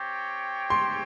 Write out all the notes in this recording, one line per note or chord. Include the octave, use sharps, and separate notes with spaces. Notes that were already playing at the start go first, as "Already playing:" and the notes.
Already playing: C4 G4 C#5 G5
C6